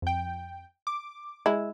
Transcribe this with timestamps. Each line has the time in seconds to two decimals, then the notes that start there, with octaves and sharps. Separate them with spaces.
0.02 F2 G5
0.87 D6
1.46 G#3 E4